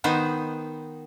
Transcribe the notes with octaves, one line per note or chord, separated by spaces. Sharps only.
D#3 B3 D#4 C5